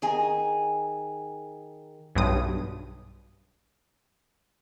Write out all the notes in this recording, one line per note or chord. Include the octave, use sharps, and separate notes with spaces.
D#3 G#4 G#5 A#5
B1 G2 D#6